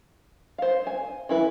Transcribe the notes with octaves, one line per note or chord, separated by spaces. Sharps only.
C5 F5
G#5
E3 E4 B4